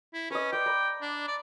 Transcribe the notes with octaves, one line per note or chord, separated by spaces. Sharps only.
E4
C#4 B4 D#5
D5 G5 C6
A#5 B5
D4
D5